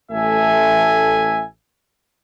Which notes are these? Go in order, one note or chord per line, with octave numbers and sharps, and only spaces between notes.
A1 A3 A4 E5 G#5